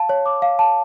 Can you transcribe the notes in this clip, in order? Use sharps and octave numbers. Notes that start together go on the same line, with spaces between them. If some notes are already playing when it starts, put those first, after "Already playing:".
Already playing: F5 A5
C#5
D6
F5
A5